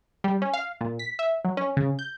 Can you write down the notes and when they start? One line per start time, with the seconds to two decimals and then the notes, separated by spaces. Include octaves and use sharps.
0.24 G3
0.42 C#4
0.54 F5
0.81 A#2
0.99 B6
1.19 E5
1.45 F#3
1.57 C#4
1.77 C#3
1.99 G6